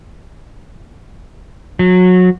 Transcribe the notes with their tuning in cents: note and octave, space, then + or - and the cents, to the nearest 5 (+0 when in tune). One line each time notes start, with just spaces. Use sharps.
F#3 -25